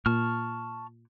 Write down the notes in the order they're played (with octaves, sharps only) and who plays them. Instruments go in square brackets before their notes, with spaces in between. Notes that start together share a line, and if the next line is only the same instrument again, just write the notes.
[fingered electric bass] A#2 [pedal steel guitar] A5 C#6 F6